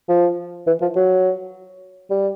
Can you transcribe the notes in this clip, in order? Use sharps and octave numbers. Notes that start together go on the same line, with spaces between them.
F3
E3
F3
F#3
G3